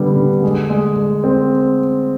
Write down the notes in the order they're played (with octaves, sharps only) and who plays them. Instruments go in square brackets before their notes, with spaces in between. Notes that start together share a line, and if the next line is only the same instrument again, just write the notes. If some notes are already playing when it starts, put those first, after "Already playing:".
Already playing: [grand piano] D3 G3 B3
D3
G#3
G#3
G#3
C4